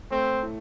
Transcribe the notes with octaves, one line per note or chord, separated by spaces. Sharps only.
A3 C4
A2